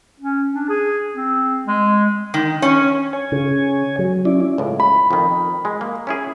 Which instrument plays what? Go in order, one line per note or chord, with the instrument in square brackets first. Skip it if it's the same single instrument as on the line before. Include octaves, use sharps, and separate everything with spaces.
[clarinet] C#4
D4
G#4
C4
G#3
[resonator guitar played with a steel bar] D#3
C#4
[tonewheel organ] C#5 G#5
[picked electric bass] C#3
F#3
[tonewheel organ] C#4 E4 D5
[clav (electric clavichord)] C#2 A2
[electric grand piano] B5
[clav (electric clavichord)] F2 D#3
G#3
A#3
C#4 E4 G#4